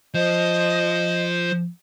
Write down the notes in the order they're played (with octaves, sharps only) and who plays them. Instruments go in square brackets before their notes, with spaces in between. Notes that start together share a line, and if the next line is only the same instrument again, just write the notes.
[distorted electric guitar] F3 [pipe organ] C5 [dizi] D#5